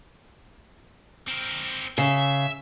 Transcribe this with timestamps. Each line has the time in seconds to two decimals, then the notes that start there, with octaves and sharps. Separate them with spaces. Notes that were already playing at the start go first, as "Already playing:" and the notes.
1.28 C4 A#4
1.98 C#3 E5